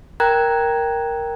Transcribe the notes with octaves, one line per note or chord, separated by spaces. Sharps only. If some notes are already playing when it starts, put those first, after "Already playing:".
A#4 G5 A#5 F#6 G#6